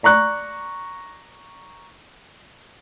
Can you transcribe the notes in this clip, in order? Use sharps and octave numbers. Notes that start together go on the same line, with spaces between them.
D5 A#5 C#6 F#6